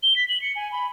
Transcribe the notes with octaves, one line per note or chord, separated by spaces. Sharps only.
G7
B6
F#7
C#7
G#5
B5